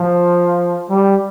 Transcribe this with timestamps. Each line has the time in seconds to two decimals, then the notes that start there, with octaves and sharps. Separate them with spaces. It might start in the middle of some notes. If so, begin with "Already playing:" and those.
Already playing: F3
0.89 G3